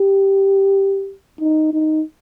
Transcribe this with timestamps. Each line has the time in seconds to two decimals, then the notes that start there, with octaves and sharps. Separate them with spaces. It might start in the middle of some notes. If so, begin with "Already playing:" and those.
Already playing: G4
1.40 D#4
1.73 D#4